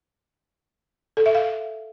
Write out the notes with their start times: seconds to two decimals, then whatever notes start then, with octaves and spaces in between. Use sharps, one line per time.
1.17 A4
1.26 E5
1.35 F5